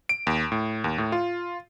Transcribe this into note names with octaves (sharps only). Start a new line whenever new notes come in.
D7
D#2
A2
D#2
A2
F4